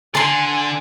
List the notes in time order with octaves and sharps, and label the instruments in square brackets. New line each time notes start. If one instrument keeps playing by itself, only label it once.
[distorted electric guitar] D3 [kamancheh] G#5 [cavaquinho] A5 C6